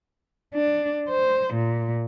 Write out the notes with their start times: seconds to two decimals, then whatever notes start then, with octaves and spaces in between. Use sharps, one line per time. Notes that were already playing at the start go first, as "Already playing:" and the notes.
0.54 D4
1.09 C5
1.53 A#2